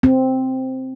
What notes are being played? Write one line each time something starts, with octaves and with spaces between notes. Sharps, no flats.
C4